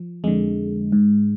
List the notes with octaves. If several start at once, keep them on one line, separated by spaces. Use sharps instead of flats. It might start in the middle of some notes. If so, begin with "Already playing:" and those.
Already playing: F3
F2 D3 G#3
G#2